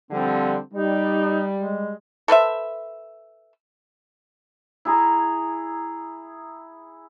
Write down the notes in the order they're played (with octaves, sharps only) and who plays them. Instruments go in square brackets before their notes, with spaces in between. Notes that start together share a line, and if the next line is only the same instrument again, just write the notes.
[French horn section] D3 F3 G3 [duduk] C4
[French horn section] G3 [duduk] D#4
[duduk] G#3
[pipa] A4 B4 C5 E5
[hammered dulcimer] E4 G#4 A#5